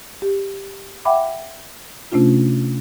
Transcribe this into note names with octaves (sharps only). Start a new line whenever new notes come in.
G4
E5 F#5 G5 B5 D6
C3 A3 C#4 D4 F4